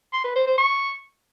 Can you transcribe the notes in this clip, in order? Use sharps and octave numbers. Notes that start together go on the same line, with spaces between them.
C6
B4
C5
C5
C#6